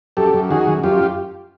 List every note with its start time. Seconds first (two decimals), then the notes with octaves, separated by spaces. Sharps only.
0.17 F#2 G4 A4
0.34 F#2
0.51 D#3 F#4 G#4
0.67 F#2
0.84 F#2 F4 G4